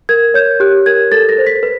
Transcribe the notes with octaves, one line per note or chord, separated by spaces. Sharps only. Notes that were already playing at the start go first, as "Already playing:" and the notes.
A#4 G#6
C#5 G6
G4 F#6
A#4 G#6
A4 A6
A#6
C5
B6
B4